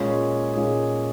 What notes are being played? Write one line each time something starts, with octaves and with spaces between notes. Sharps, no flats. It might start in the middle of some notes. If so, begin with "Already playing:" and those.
Already playing: A#2 G#3 C#4 G#4
A#2 G#3 C#4 G#4